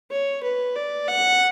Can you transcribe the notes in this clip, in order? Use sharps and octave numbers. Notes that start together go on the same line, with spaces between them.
C#5
B4
D5
F#5